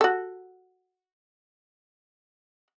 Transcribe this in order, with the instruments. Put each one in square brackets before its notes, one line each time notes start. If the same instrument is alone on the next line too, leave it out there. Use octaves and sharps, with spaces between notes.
[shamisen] F#4 A4